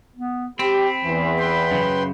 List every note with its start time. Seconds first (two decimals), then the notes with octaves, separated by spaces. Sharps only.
0.15 B3
0.59 C4 G4 B5
1.04 E2 E3
1.39 B4 G5 C6
1.72 F#2 C#3